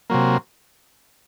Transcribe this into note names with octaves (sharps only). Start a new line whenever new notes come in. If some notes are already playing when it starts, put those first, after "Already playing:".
C3 F#3 A#3